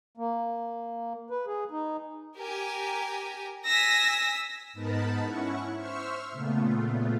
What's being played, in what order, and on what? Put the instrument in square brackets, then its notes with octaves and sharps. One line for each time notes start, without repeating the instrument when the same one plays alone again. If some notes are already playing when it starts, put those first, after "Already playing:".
[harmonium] A#3
B4
G#4
D#4
[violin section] G4 A#4 G#5
[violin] G#5 A#6 [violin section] E6 B6
[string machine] G#2 B3 D#4 A#4 A5 B5
C#4 E4 F#5 C#6
C5 E5 C#6 E6 F6
A#2 C#3 A3 B3 F4